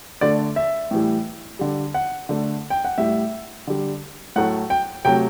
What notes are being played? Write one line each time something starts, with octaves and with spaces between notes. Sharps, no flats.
D3 A3 D5
E5
A2 E3 G3
D3 G3
F#5
D3 A3
G5
F#5
A2 G3 E5
D3 G3
A2 F#3 A3 F#5
G5
C3 F#3 A3 G5